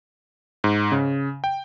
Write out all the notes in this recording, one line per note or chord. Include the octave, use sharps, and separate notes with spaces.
G#2
C#3
G5